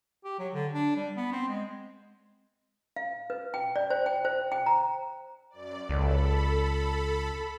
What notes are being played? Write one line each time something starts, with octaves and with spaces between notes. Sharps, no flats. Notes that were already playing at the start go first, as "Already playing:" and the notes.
G4
F#3
D3
D4
G3
B3
C4
G#3
F5
B4
G5
D5
C5
G5
C5
G5
A#5
F#2 D5
C#2 A4 B5